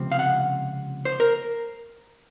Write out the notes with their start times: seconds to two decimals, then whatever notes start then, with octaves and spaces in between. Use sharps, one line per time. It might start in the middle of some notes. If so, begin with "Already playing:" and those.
Already playing: C#2 C3 F3 C4
0.12 F5
0.19 F#5
1.05 C5
1.20 A#4